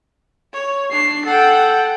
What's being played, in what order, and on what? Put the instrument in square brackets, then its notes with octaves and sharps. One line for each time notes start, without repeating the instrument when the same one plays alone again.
[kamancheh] C#5
[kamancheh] D4 [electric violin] C7
[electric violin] A4 G5 [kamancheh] F#5